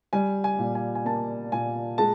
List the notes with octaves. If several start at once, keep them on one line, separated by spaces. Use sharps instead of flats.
G3 G#5
G#5
A#2
G#5
G#5
A#3 A5
A#2 G#5
G#3 A5